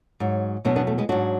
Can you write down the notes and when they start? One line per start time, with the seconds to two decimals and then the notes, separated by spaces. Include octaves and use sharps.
0.20 G#2 F#3
0.65 E2 B2 F#3 B3 D4
0.76 B3 D4
0.87 A3
0.98 G#3 B3
1.09 G#2 F#3 D4 F#4